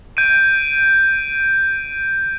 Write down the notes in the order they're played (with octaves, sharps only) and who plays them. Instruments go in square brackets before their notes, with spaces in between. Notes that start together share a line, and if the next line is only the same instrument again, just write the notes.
[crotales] G6 D7 D#7